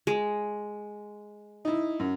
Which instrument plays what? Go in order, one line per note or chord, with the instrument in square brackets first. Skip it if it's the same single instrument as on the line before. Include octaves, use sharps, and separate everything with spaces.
[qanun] G#3
[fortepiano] D#4 E4
F#2